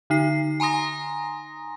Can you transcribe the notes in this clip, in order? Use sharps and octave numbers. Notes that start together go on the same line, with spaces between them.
D3 D#4 C7
G#5 A#5 C6 D#6 A#6